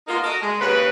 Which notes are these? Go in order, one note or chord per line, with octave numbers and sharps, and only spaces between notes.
G#3 A#3 B3 D#4 F4 A#4
F#4 A4 A#4 D#5
G#3
D#2 C#3 B4